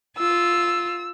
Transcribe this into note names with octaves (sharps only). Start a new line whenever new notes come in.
F4 E6